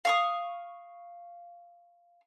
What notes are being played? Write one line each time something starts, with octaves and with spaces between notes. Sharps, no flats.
F5 C#6 D#6